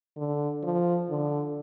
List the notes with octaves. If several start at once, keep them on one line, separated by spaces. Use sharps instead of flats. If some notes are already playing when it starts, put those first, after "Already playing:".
D3
F3
D3